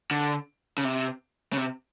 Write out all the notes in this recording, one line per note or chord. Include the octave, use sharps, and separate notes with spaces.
D3
C#3
C3
C#3
C3